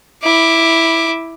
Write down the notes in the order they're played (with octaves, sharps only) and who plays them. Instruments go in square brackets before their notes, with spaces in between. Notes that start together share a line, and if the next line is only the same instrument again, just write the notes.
[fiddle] E4 D6